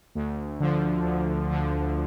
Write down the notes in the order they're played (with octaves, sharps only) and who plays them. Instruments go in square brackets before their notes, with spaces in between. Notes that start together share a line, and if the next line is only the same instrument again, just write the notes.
[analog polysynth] D2
D3 F3
D2
D3 F3